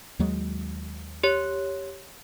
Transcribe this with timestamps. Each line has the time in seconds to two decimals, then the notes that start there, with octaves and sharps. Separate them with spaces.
0.19 D#2 F#3 G#3
1.24 G4 C#5